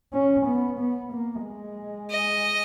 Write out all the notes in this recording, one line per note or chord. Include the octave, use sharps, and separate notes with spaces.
C#4
B3
B3
A#3
G#3
D#5